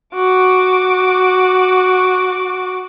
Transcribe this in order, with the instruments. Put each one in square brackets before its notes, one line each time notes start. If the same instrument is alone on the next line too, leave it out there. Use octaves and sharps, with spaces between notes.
[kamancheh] F#4 D6